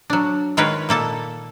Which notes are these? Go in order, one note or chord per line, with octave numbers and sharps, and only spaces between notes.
F#3 D4
D#3 G#3 F4 A#4 B4 C#5
A#2 A#3 A4 A5